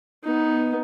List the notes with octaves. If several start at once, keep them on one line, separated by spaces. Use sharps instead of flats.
B3 D#4